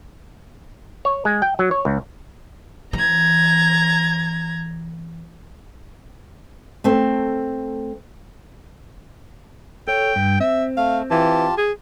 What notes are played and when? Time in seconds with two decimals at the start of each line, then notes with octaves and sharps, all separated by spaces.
1.05 C#5
1.25 G#3
1.42 G5
1.59 F#3
1.71 C#5
1.85 C#2
2.93 E3 A#5 G#6
6.84 A3 C4
9.88 A4 C#5 G5
10.16 G2
10.40 C4 E5
10.77 A3 F5
11.10 E3 F4 G4 A5
11.57 G#4